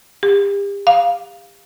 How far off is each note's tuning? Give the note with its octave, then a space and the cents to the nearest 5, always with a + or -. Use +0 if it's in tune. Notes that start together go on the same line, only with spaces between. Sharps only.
G4 +40
F5 +0